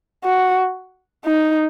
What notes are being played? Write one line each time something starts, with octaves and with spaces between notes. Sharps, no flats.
F#4
D#4